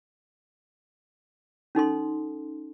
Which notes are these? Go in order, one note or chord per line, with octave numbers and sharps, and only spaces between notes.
C#4 D#4 A4 C6